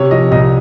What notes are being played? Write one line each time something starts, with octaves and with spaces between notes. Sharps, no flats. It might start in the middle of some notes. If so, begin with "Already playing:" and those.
Already playing: C3 C#5
F3 D#5
C2 D#5